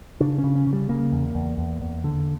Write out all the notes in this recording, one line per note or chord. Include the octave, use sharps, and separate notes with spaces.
C#3 D4
C#4
C#3
C#4
C#3
G3
C#3 A#3
E2
E2
E2
E2
D3